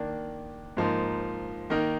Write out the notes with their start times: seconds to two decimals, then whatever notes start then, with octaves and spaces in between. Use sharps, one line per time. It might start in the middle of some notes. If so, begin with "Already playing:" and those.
Already playing: D#3 A#3 D4
0.77 G#2 F3 A#3 D#4
1.70 D#3 A#3 D#4 A#4